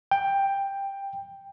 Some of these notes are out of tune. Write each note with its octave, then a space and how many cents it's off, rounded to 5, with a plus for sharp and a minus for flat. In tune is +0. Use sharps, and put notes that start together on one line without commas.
G5 +10